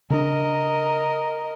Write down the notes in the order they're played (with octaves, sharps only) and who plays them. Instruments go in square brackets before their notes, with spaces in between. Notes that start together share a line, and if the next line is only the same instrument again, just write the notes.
[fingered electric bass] C#3 D4 [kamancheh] A#4 D#5